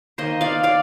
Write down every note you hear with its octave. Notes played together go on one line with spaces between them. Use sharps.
D#3 A#3 C5 D#5
D5 F5
D5 F5